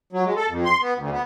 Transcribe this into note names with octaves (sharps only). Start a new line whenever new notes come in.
F#3
G#3
A4
F2
C6
B3
D2
B3